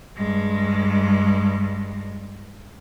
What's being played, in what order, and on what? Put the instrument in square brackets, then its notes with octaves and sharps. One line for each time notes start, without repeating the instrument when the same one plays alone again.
[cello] G2 G#3